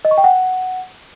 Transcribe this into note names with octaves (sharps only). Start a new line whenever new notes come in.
D#5
C#6
G5
F#5